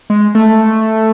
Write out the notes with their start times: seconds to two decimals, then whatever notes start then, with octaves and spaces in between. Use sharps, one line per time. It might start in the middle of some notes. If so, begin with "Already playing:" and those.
0.10 G#3
0.35 A3